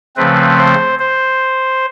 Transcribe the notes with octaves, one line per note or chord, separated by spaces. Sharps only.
C#3 F3 A3 C4 B4
C5
C5